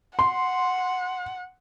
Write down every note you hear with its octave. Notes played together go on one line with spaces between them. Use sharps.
F#5 C6